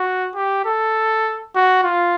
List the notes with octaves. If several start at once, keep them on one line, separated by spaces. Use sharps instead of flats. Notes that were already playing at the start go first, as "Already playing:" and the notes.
Already playing: F#4
G4
A4
F#4
F4